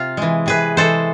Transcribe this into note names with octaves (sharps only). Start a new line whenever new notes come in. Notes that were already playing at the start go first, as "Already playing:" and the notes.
Already playing: C3 F4
E3 G#3
C3 G#4 B4
E3 G#3 A4 C5